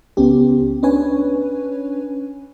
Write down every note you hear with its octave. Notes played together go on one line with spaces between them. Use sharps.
C#2 B3 C#4 G4
C#4 D4 B4 C#5 G#5